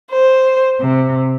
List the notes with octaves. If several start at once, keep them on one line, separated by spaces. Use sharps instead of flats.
C5
C3